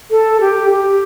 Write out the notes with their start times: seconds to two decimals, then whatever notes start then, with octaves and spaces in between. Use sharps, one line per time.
0.11 A4
0.41 G4
0.70 G4